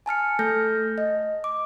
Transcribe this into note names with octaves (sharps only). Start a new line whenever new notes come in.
G#5 A5 F6 C#7
A3 A4 F6 G6 A#6
D#5
D6